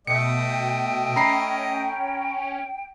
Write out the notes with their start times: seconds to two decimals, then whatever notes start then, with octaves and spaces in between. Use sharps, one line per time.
0.07 B2 A3 D#5 G5 C#7
1.16 C#4 A#5 B5 C7